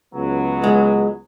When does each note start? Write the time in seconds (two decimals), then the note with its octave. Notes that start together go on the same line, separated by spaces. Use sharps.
0.14 C#2 F#3 B3
0.64 G#3